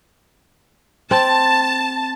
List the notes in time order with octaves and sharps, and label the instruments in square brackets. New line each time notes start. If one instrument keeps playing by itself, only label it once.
[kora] C4 [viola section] A5